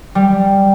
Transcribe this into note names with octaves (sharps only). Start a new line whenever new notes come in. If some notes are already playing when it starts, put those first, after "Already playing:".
G3